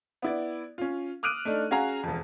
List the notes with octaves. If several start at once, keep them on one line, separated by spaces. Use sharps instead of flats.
B3 E4 D5
C#4 F4
D6 D#6 F6 F#6 D7 D#7
A3 D4 D#4
C#4 F#4 G#4 F5 G#5 A#5
E1 F2